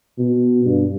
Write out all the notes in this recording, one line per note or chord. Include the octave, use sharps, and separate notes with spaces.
B2
G2